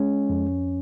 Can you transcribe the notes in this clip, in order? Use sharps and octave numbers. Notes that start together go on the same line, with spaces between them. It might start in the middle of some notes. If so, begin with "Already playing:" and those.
Already playing: G#3 C#4
F2